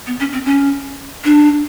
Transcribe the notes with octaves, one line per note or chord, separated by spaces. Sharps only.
B3
C#4
C4
C#4
D4